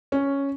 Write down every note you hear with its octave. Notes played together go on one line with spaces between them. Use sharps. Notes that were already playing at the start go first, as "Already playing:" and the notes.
C#4